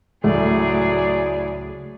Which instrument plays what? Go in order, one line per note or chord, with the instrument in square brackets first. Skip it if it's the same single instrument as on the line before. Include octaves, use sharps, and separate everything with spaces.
[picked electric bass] C#2 [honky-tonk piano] A2 [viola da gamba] F#3 G#4 D5